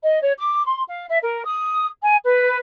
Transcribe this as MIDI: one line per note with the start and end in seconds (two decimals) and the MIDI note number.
0.02 0.19 75
0.22 0.32 73
0.38 0.64 86
0.66 0.83 84
0.88 1.06 77
1.08 1.17 76
1.22 1.45 70
1.45 1.87 87
2.02 2.16 80
2.25 2.58 71